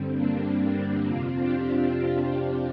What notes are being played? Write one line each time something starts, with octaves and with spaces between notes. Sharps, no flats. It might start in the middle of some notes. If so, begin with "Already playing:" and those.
Already playing: G2 D3 G3 C4
A#3 D4
A#3 D4
F2 C3 C4 F4
D4 G4
D4 G4
C4 F4